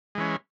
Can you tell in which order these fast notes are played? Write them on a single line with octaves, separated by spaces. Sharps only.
G#3 E3 C#4